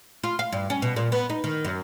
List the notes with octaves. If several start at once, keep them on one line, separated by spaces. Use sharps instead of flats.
F4
F5
G2
C#4
B2
A#2
B3
D#4
D#3
F#2